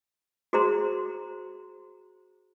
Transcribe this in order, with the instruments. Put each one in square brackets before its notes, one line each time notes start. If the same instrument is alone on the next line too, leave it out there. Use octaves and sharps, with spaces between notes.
[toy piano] F#4 G#4 C5 A#5 C6